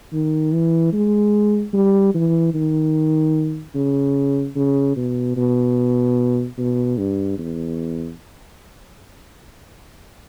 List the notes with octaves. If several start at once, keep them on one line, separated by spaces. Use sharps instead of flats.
D#3
E3
G#3
G3
E3
D#3
C#3
C#3
B2
B2
B2
G2
E2